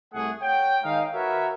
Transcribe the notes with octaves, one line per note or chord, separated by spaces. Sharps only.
C2 A3 G#4 F#5
C#5 F#5 G5
D#3 G#3 D#4 F5
F#4 A#4 B4 C#5 E5